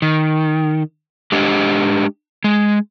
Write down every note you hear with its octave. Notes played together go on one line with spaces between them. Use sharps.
D#3
G#3 D4 G4 D#5
G#3